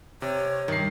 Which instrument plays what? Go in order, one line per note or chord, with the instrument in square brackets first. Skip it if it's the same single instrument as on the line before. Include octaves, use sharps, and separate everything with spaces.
[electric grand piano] C3 [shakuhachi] C#5
[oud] G2 [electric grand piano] D#3 C7